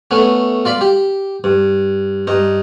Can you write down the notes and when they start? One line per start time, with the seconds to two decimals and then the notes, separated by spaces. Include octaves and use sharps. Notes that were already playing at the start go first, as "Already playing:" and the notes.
0.11 A3 B3 C#4
0.65 F4 D5 B5
0.81 G4
1.44 G2
2.27 G2 D#4